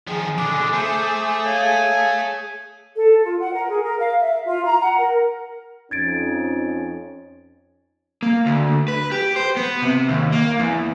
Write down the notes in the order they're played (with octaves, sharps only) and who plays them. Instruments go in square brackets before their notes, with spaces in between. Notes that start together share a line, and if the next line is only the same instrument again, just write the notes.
[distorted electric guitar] D#3 F3 [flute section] G#4
[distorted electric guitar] B2 D3 [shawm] D4 [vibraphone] D6
[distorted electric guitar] A3 [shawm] C5
[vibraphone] C#5 F5 [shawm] G#5
[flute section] A4
F4
F#5
A#4
G#4
A#4
F5
E5
F4
A#5
F#5
A#4
[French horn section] F2 C#4 D#4 [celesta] G#6 A6 D7
[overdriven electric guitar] A#3
D2
B4
G4
C5
B3
C3
D#2
A#3
E2